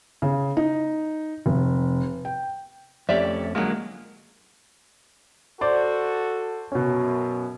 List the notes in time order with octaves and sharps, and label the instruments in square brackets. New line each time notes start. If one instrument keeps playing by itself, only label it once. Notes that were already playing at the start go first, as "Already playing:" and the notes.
[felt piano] C#3
D#4
F1
G5
[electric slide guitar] F2 A3 C#4 [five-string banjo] G4 D5 E5
[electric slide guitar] D3 G#3 A#3 [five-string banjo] F3 F#3
[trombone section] F#4 A4 [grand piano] C5 D5
[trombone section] F#2 [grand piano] B2 C#4